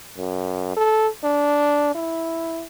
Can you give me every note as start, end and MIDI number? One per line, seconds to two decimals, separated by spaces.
0.17 0.75 42
0.76 1.08 69
1.24 1.95 62
1.95 2.65 64